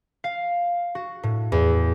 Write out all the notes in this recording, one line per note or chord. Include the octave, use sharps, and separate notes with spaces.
F5
F#4
A2
E2